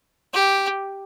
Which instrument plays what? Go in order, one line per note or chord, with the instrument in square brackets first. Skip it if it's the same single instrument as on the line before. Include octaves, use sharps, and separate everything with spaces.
[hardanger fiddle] G4